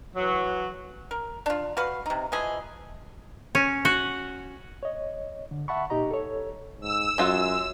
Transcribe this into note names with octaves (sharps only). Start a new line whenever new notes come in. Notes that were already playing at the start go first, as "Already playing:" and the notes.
E3 F#3
A#4
D4 F4
F#4 B4 F5
C3 D#4
E3 F3 G#4 D#5
C#4
F#4
C#5 D#5
D3
E5 F#5 A5 B5 C#6
A#2 D#4 G4 D#5 A#5
A4 C#5
G#2 E6
F#2 G#3 F4 F#5